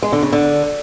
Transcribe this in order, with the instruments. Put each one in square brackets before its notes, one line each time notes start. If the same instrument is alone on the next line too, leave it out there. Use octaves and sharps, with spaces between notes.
[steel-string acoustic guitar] G#3
D3
C#3
D3